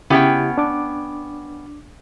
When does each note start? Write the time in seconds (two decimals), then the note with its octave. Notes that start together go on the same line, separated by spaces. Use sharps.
0.10 C#3 B3 C#4 E4 G4 G5
0.58 D4 D6